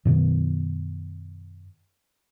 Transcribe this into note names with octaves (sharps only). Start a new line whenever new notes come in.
F#2 B2 D#3 B3